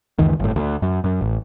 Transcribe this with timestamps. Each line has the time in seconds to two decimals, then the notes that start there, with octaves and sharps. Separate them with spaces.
0.18 C#2 F#2 D#3 E3
0.39 G1 A2
0.56 D2
0.82 F#2
1.04 F#2
1.21 A1